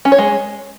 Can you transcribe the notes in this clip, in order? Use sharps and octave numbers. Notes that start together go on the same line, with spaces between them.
C#4
C#5
G#3